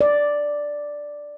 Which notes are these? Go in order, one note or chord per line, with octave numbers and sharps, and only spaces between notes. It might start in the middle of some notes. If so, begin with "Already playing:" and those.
D5